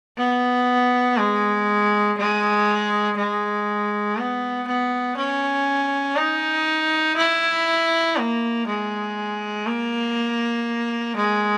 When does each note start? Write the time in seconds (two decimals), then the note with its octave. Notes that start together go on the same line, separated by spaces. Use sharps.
0.18 B3
1.17 G#3
2.18 G#3
3.17 G#3
4.18 B3
4.67 B3
5.17 C#4
6.17 D#4
7.17 E4
8.17 A#3
8.67 G#3
9.67 A#3
11.16 G#3